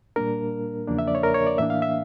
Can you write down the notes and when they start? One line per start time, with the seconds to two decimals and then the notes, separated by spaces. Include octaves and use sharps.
0.16 A#2 G3 A#3 D4 A#4
0.87 E2 C#3 F3 A#3 D4
0.99 E5
1.08 D5
1.15 C#5
1.23 A#4
1.34 C#5
1.47 D5
1.58 A2 E3 A#3 D4 E5
1.70 F5
1.82 E5